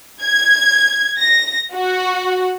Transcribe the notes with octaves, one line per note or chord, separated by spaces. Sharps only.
G#6
A#6
F#4